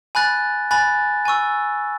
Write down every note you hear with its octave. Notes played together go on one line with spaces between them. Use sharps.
G#5 B5 F#6 A6
G#5 B5 F#6 A6
G#5 C#6 E6